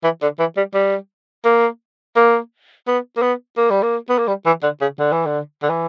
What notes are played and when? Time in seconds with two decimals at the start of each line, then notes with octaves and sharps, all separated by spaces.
0.04 E3
0.22 D3
0.39 E3
0.57 G3
0.74 G3
1.45 A#3
2.16 A#3
2.87 B3
3.17 A#3
3.22 B3
3.57 A#3
3.70 G3
3.83 A#3
4.09 B3
4.18 A#3
4.27 G3
4.46 E3
4.63 D3
4.81 C#3
4.99 D3
5.12 E3
5.26 D3
5.63 D3
5.69 E3